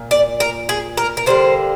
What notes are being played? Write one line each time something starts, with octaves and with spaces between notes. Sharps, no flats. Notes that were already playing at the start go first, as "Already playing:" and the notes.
Already playing: A#2
D5
A#4
G#4
A#4
A#4
D3 G3 A#3 C5